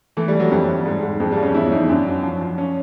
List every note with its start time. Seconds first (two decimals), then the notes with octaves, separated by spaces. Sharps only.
0.17 E3 A3
0.28 G3
0.34 E3
0.40 F#3
0.51 F2 G3
0.68 F2
0.86 G#2
1.03 G#2
1.20 F2 G#3
1.32 G3
1.37 F3
1.43 C#4
1.55 E2 E4
1.72 E2 D#4
1.89 F#2 D4
2.06 F#3
2.23 F3
2.41 F3
2.58 C#4